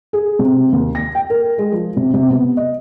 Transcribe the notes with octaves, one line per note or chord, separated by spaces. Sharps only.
G#4
C3
D#2
A#6
G5
A#4
G#3
F3
C3
C3
B3
D#5